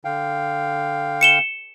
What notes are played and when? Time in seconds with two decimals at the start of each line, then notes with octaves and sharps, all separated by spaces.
0.05 D3 F5 G5
1.21 C#7 E7 G7